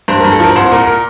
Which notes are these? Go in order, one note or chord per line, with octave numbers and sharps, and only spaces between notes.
G2 C5
G2 A#4
A4
F3 A#4
C2 C5
A#2 A#4
A#4